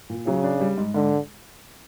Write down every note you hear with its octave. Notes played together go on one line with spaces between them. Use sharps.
A#2
C#3 F#3
D4
G3
G#2
G#2 D3